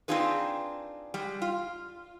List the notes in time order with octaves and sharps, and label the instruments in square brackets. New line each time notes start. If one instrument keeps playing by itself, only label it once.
[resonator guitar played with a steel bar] C4 D4 D#4 F4 G#4 B4
G3 G#3
F4